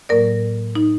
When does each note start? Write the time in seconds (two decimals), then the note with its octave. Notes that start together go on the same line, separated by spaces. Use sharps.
0.09 A2 F#3 A#3 A#4 D5
0.75 D#4